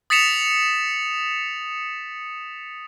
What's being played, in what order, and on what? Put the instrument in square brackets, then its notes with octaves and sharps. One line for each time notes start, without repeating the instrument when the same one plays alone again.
[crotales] D#6 A6 B6 C#7 E7 F7